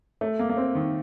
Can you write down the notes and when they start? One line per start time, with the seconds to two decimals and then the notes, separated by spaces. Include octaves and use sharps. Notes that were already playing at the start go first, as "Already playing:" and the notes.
0.21 A3
0.39 A#3
0.50 A#3
0.57 C4
0.75 D#3